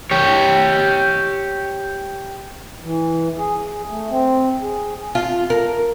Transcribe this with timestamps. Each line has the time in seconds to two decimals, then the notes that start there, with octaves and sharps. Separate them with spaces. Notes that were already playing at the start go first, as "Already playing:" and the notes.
0.11 G4 C#5
2.82 E3
3.37 G#4
3.88 A3
4.10 C4
4.61 G#4
5.15 F4
5.50 A#4